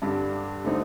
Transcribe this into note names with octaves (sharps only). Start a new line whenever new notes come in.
G2 D3 G3 D4 G4
D3 A3 C4 D#4